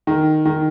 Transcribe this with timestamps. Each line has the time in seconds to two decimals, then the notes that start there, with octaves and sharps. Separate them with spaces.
0.07 D#3
0.45 D#3